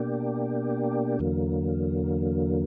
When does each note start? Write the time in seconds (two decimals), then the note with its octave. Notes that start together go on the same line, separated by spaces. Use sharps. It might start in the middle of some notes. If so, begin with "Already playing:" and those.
Already playing: B2 A#3 D4 G4
1.19 E2 D3 F#3 A#3